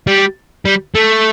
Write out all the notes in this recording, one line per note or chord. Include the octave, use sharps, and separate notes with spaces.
G3
G3
A3